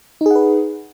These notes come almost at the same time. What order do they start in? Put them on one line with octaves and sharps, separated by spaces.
D#4 G#4 F#5 B4